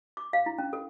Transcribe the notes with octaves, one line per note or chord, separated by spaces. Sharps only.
D6
F5
E4
C#4
A4